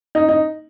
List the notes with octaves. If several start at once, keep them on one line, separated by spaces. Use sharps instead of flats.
D#4
D#4